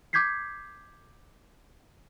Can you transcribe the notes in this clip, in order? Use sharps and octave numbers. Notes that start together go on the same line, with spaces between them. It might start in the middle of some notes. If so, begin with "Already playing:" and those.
D6 G6 G#6 B6 C7